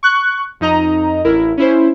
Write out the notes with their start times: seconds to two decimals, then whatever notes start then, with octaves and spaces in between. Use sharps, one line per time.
0.03 C#6 F#6
0.60 F2 D#4 D#5 A#5
1.24 A1 E4 A#4
1.57 C#4 E4 C5